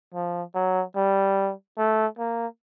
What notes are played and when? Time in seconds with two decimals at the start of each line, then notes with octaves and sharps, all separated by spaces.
0.14 F3
0.55 F#3
0.96 G3
1.78 A3
2.18 A#3